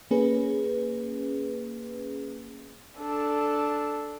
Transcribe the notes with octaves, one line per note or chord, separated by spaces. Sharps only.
A#3 C#4 G#4 B4
D4 A4